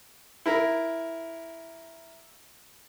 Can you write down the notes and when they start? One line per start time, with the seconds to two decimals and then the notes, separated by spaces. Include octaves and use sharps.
0.46 E4 A#4